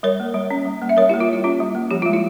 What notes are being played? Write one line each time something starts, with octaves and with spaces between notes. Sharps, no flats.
G3 A#4 C#5
A#3
G3
C#4
G3
A#3
E5
G3 A#4 C#5
E4 G4
A#3
F4
G3 E4
C#4 F4
G3
A#3
F3 G4
G#3 F4
E4